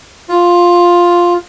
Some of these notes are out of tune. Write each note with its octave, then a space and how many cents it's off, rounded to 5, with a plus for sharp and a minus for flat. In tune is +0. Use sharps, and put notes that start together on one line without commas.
F4 +5